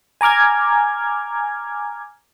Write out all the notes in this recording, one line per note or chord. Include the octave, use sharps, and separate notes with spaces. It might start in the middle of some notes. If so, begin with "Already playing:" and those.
G#5 A#5 D6 F6 G#6